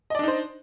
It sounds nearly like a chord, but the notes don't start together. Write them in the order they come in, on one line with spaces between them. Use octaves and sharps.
D#5 D5 D4 D#4 C5